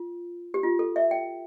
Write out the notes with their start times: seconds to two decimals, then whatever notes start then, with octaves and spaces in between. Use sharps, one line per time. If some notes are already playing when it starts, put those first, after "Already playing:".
Already playing: F4
0.54 G4
0.63 F4
0.79 A4
0.96 E5
1.11 G5